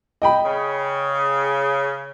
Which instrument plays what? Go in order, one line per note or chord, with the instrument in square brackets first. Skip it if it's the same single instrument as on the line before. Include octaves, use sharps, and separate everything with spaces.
[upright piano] D#5 G5 B5
[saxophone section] C#3